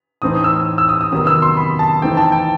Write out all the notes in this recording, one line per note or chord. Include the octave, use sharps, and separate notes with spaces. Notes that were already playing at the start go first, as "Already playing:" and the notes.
A2 E3 A3 C4 D#4 D#6
E6
E6
D#6
D#6
C3 D#3 F#3 B3 D#6
E6
C6
B5
A5
E3 A3 C4 D#4 G5
A5
G5